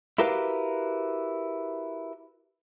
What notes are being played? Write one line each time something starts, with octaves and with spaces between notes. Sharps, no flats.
E4 F#4 G4 A#4 B4 F5